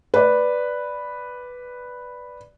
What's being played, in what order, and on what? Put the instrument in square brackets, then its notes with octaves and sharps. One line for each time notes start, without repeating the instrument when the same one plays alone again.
[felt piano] B4 D5